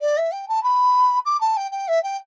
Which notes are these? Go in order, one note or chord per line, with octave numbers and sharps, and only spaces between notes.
D5
E5
G5
A5
B5
D6
A5
G5
G5
E5
G5